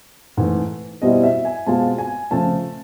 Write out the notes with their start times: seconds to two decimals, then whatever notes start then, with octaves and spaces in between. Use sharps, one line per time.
0.37 G#2 E3 A3
1.02 B2 G3 C4 E4 D#5
1.24 E5
1.45 G#5
1.67 B2 G#3 C4 F4 A5
1.98 G#5
2.31 C#3 F3 A3 A5